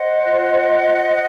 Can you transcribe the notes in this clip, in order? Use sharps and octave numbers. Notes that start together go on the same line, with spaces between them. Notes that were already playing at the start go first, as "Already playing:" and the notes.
Already playing: C5 D#5 F#5
F4
C5